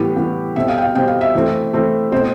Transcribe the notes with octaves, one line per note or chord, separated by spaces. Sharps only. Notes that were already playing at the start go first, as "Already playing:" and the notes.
Already playing: A2 E3 G3 B3 G4
A2 E3 G3 B3
B2 G3 C4 E5
F5
G5
F5
B2 G3 C4 G5
F5
E5
E3 A3 C4
E3 A3 C4
B2 A3 C4 C5